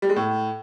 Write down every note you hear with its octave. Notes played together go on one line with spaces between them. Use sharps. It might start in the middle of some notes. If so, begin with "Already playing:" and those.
G3
G#3
A2